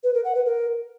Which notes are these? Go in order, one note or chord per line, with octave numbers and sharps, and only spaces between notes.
B4
A#4
F#5
B4
A#4